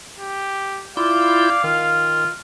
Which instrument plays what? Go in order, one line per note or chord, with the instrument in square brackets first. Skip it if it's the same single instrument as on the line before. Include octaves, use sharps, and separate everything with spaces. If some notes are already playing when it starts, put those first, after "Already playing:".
[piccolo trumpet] G4
[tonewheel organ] E4 F4 G6 [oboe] D5 [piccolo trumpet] F5
[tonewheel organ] D#3 [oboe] F4